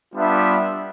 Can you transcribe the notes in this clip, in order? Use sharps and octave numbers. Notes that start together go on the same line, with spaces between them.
G3 B3 D4 F4 E5